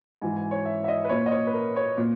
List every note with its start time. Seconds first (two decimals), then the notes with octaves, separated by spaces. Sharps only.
0.22 G#2 E3 G#5
0.36 G#5
0.51 C#5
0.65 E5
0.84 E5
0.88 D#5
1.04 B4
1.09 A#2 C#5
1.26 D#5
1.32 C#5
1.47 B4
1.53 A#4
1.76 C#5
1.97 A#2